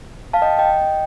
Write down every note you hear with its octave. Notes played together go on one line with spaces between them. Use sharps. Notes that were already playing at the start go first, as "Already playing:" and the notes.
F5 A5
D#5 G5
D#5 G5